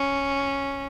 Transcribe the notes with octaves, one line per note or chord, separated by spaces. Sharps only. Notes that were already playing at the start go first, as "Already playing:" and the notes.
Already playing: C#4